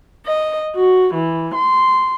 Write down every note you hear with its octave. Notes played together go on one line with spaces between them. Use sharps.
D#5
F#4
E3
C6